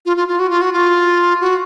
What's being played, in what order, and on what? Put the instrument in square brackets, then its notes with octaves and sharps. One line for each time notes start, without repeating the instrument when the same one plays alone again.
[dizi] F4
F4
F4
F#4
F4
F#4
F4
F#4